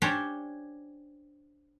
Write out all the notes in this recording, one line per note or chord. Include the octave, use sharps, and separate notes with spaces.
C#4 D4 G4 C5 C#5